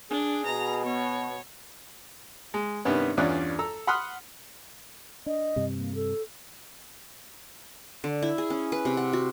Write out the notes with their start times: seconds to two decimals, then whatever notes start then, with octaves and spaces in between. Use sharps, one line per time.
0.11 D4 G#4
0.46 B2 A#5
0.85 B3 C#5
2.54 G#3
2.85 G2 C3 D#3 B3 C#4
3.17 E2 G2 C#4 F4 D5 F#6
3.59 A4 A#5 E6
3.87 F#5 B5 C6 D#6 F6 F#6
5.26 D4 D#5
5.56 G2 C3
5.77 A#3
5.95 A4
8.04 D3
8.22 E4
8.38 G#4
8.50 C#4
8.72 B4
8.85 C3
8.97 F#5
9.13 F#4